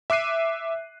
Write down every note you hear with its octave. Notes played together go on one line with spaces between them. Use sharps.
E5 D6 F#6 C7 D#7